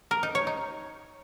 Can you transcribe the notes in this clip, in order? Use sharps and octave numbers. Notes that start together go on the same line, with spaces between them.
A#4
D#4
C#5
D#4